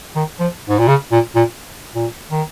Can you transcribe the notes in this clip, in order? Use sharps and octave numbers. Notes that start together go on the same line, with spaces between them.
D#3
F3
G#2
A#2
C#3
A#2
A#2
A#2
D#3